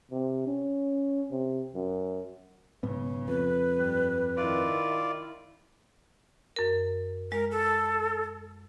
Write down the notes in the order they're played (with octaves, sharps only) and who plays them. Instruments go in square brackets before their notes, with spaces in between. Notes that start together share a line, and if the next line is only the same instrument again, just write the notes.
[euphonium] C3
C#4
C3
F#2
[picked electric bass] B1 G#2 B3 [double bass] C#3
[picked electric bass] F2 [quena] B4
[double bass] G2 G3
[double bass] D#3 E4 [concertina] F4 D5
[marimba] F#2 A#4
[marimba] G#3 [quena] A#4
[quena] A4